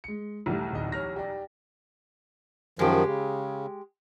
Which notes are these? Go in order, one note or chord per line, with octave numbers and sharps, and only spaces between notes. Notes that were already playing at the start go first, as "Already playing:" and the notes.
G#3 C#7
B1 E2 G3 A3
D1 D#5
C#5 F6 A#6
G4 D5
F#2 D#3 F3 G#3 G4
C#3